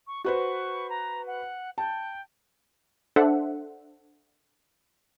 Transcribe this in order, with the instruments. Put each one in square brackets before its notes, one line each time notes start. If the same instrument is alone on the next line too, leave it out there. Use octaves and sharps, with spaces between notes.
[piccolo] C#6
[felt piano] F#4 B4 C5 [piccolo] C#6
[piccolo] A#5
F#5
[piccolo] G5 [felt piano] A5
[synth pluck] D4 A4 C5 E5 F#5